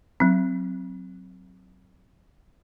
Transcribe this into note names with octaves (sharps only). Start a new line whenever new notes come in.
F#3 C4